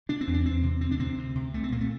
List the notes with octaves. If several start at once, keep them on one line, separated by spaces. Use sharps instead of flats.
C3 D4
C4
E2
D4
E2 C4
C3
D2 C4
D4
C3 C4
D2
C3
C2 A3
C4
A#2 A#3
A3